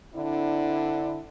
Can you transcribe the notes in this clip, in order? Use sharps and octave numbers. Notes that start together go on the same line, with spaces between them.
D3 C4 D4 E4